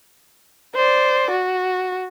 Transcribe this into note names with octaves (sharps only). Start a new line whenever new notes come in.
C5 D5
F#4